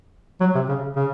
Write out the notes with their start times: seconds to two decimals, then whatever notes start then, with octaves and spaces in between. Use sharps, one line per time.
0.41 F#3
0.55 C3
0.69 C#3
0.96 C#3